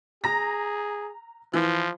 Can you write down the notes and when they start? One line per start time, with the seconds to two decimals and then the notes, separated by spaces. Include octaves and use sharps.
0.24 G#4 A#5 A#6
1.54 E3 F3